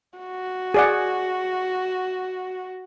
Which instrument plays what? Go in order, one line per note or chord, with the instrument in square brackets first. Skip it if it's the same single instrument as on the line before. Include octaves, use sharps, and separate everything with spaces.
[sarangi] F#4
[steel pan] G#4 D5 F#5